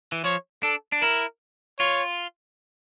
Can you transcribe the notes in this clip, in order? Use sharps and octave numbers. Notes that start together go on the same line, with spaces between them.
E3
F3 C#5
D4 A4
D4
E4 A#4
F4 C#5